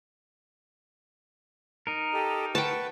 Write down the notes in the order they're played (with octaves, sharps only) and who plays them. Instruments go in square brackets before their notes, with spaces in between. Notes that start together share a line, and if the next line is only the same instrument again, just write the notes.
[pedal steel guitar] D#4 A#4
[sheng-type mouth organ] G4 A4 D#5
[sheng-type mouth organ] B4 F#5 C#6 [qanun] G5 A5